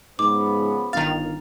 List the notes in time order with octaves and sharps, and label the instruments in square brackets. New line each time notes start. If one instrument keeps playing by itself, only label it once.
[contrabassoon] G#2 [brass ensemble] C#3 F3 B3 [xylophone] D6
[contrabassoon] G1 [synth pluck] D#3 F5 [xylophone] A#5 A6